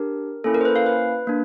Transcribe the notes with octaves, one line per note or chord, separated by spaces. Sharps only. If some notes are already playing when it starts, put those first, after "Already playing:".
Already playing: D4 G4 A#4
A#3 C#4 E4 A4
A#4
C5
B4
F5
B4
A#3 D4